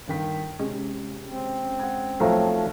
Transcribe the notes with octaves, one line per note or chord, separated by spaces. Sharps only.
G1 D#3 B6
C3 G#3 C#4
C4
F#5 G#6
B1 F3 A3 C#5 A#5